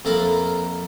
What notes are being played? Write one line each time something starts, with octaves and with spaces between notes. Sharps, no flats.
F2 A#3 A4 A#4 E5 B5